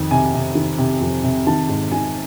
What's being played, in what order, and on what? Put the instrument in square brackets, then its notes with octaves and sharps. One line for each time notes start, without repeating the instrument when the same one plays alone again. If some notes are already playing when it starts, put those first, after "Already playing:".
Already playing: [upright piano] F2 D#3
C3 G#5
C3
D#3
C3
F2
C3
D#3 A5
G#2
D#3 G#5